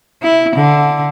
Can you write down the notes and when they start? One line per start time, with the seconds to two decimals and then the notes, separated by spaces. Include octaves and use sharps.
0.22 E4
0.56 D3